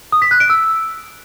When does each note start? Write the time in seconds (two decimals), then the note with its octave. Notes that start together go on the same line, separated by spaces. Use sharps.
0.12 D#6
0.22 B6
0.31 F#6
0.40 D7
0.50 E6